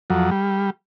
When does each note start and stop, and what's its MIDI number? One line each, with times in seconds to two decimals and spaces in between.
0.10 0.30 41
0.10 0.30 54
0.31 0.70 55